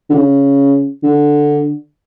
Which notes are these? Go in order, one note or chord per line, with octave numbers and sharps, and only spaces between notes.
D3
C#3
D3